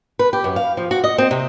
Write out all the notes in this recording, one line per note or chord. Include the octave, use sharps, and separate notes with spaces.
B4
G4
F#2
F5
F3
F#4
D#5
C4
C3